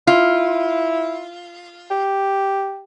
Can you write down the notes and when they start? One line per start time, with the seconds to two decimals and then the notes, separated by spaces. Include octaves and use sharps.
0.07 E4 F4
1.91 G4